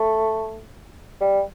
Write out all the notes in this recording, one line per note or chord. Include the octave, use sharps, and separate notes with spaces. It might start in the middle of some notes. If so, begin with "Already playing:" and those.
Already playing: A3
G3